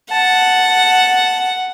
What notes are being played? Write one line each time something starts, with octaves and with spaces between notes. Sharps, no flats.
F#5 A5